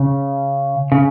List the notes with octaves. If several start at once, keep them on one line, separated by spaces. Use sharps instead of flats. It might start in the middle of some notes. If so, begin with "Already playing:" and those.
Already playing: C#3
C#3